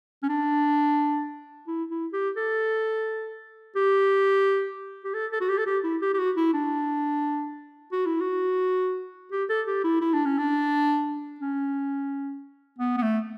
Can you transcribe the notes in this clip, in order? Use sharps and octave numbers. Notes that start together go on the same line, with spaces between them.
C#4
D4
E4
E4
G4
A4
G4
G4
A4
A4
F#4
G4
A4
G4
E4
G4
G4
F#4
E4
D4
F#4
E4
F#4
G4
A4
G4
E4
E4
D4
C#4
D4
C#4
B3
B3
A3